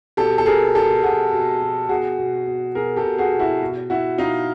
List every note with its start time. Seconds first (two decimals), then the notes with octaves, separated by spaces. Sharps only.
0.17 B2 G4 A4
0.38 A4
0.46 B2 G#4 A#4
0.75 B2 G4 A4
1.03 B2 F#4 G#4
1.32 B2
1.61 B2
1.89 B2 F#4 G#4
2.19 B2
2.47 B2
2.75 B2 G#4 A#4
2.96 G4 A4
3.04 B2
3.18 F#4 G#4
3.33 B2
3.39 E4 F#4
3.62 B2
3.90 B2 E4 F#4
4.18 B2 D#4 F4